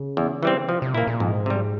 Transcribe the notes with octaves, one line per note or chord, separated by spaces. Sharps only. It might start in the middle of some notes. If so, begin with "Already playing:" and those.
Already playing: C#3
E2
E3 G3 C4
C3 F3
C3
A#2 A#3 E4
A#2
F2 G#2
C3 G3